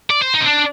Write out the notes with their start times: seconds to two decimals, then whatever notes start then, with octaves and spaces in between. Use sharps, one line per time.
0.10 D5
0.22 C5
0.34 D#4
0.41 C4
0.46 D4